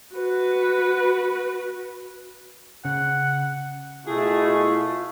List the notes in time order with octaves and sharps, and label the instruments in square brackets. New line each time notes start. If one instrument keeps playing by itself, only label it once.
[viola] F#4 B4
[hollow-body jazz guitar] C#3 [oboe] F#5
[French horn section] B2 E4 [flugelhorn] A3 [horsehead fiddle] F4 [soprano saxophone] G#4